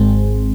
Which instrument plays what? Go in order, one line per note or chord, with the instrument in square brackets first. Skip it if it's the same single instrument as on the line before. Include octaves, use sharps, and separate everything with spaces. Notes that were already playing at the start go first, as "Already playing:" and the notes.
Already playing: [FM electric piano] G#1 G#2 G#3 C4